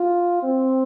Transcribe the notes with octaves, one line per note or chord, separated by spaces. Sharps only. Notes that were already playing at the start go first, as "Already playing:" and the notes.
Already playing: F4
C4